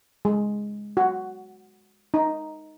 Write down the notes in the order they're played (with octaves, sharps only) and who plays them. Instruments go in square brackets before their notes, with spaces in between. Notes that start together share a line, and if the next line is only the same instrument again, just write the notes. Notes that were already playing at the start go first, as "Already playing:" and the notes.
[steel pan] G#3
F#4
D#4